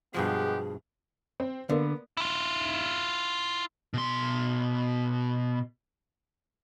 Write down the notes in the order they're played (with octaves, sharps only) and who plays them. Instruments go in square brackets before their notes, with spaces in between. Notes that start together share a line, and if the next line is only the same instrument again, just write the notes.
[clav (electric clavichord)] G2 B2 F3 [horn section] G#3 B3 G4 [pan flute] G#4
[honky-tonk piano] C4
[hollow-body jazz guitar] D3 [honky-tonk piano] A#3 B3
[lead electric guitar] E4 F4
B2 C6